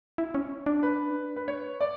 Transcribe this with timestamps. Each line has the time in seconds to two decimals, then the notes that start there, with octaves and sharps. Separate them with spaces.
0.18 E4
0.35 C#4
0.66 D4
0.83 B4
1.36 B4
1.48 C#5
1.81 D5